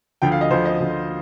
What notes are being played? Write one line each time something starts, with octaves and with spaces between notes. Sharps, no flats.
D2 D3 F3 G5
F5
D#5
D2 D3 F3 C5
D#5
D2 D3 F3